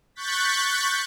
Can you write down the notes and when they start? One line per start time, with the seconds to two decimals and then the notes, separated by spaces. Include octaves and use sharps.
0.15 C#6 F#6 G6 A6 B6